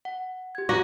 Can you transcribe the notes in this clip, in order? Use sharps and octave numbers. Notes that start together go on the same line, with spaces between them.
F#5
G4 G#6
F#4 G4 A#5 D6